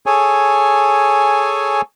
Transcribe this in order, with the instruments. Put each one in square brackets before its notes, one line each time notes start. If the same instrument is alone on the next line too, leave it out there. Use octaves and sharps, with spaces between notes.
[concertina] G#4 A4 C#5 G#5